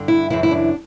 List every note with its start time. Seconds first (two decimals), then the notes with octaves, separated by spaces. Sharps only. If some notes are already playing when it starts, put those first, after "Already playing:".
Already playing: G2 D3
0.08 E4
0.30 F#2 C#3 E3 E4
0.43 E4
0.51 D4